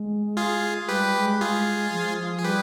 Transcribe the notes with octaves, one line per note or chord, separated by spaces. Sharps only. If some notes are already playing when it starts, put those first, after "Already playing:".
Already playing: G#3
F4 G#4
G3 G4 B4
G#3
G#3 F4 G#4
F3
G#4
G3 G4 B4